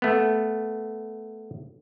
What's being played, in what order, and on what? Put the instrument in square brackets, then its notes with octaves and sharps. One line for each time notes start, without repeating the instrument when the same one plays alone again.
[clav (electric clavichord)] A3 B3